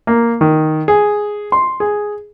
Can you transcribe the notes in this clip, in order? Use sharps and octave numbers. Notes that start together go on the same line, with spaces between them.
A#3
D#3
G#4
C6
G#4